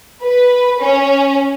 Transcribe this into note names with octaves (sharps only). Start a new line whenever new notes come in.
B4
C#4